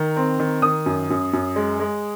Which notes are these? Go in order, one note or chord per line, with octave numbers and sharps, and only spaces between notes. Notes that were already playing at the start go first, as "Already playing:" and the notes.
Already playing: D#3 A#5
C4
D#3
D#3 D#6
F#2
F#2
F#2
G#3
G#3